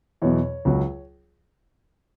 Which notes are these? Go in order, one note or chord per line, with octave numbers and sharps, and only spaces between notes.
E2 B2 F#3 C#5
C#2 C#3 F#3